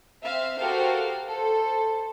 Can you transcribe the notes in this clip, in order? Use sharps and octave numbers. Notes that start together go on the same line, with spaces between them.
C4 E5 F5
F#4 G4 A4 A#4 C5 F5
A4 C5